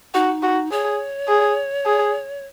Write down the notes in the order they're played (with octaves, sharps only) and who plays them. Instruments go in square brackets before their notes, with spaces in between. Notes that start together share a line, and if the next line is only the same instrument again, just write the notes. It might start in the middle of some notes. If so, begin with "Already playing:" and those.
[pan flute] D#4 [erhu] F#4
[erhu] F#4
[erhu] G#4 [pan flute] C#5
[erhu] G#4
G#4